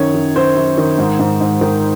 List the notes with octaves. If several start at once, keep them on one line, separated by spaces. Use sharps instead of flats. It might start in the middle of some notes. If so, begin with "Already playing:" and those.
Already playing: F#2 D#3 C#5
F#2
F#2 C5
F#2
D#3
G#2
G#2
G#2
D#3